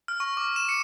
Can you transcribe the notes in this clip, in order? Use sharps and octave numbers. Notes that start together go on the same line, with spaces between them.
F6
C#6
D6
E7
C#7